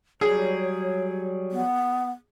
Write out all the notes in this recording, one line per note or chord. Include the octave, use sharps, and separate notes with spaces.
F#3 G3 G#4 C#5
B3